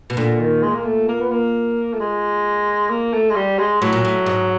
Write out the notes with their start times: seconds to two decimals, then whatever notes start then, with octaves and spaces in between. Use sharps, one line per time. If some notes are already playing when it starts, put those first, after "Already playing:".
0.10 B2
0.17 A#2 D3
0.40 D#3
0.63 G#3
0.75 A#3
0.85 A3
1.08 A#3
1.20 B3
1.31 A#3
1.93 A3
2.00 G#3
2.90 A#3
3.14 A3
3.30 G#3
3.36 G3
3.58 G#3
3.81 A2 F#3
3.93 A#2
4.05 A2
4.26 G#2